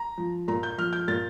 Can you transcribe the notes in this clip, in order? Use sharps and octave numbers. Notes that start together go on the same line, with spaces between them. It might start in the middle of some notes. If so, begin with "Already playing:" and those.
Already playing: A#5
F3
A#2 A#5
G6
F3 F6
G6
A#2 A6